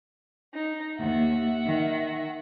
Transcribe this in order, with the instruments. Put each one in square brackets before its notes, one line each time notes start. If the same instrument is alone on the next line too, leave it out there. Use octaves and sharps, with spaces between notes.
[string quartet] D#4
[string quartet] D#2 [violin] E5 F#5
[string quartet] D#3